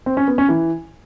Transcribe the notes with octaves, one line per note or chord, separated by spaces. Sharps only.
C4
C#4
B3
C#4
E3